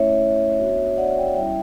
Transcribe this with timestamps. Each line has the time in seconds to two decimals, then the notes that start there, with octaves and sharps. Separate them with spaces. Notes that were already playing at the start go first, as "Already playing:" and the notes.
Already playing: A3 C#4 E4 C#5 E5
0.58 B3 D4 F#4
0.97 D5 F#5
1.17 E5 G5
1.36 G3 C#4 E4 E5 G5